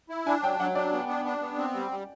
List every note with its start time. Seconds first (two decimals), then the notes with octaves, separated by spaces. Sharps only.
0.09 E4
0.26 D4 G#5
0.43 F#3 G5
0.60 F#3 F#5
0.75 D4 D5
0.93 B3
1.09 D4
1.25 D4
1.41 B3
1.58 C4
1.74 G3
1.91 G3